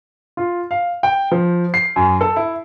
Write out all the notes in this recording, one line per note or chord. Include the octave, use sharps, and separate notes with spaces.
F4
F5
G5
F3
C7
F#2
A4
E4